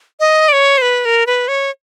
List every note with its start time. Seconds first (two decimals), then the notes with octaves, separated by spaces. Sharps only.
0.20 D#5
0.48 D5
0.53 C#5
0.78 C5
0.82 B4
1.05 A#4
1.27 B4
1.48 C#5